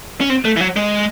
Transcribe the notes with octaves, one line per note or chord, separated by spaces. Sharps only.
C#4
C4
A3
E3
F#3
G#3